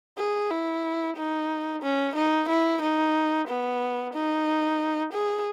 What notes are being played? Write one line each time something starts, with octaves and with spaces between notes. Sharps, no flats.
G#4
E4
D#4
C#4
D#4
E4
D#4
B3
D#4
G#4